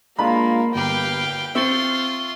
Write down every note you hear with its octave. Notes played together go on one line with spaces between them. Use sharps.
G#3 A#3 D4 F4 B5
G1 G4 B4 F5 G5
C4 F4 E5 C6 C#6 A6